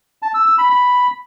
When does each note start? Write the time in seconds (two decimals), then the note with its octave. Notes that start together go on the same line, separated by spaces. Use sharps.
0.22 A5
0.34 E6
0.46 E6
0.58 B5
0.70 B5